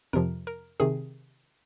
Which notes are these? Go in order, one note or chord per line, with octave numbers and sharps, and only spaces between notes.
F2 C3 F3 A#4
A#4
C3 D#3 G#4